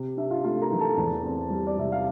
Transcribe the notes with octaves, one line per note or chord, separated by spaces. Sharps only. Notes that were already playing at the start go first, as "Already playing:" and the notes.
Already playing: C3
D4 E5
F4 F5
A3 F4 F5
A#4 A#5
E3
A4 A5
E2
C4
G3
D5
C3 E5
F5